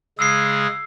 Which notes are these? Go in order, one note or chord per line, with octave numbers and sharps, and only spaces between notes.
C#3 G#3 G#4 E6 C7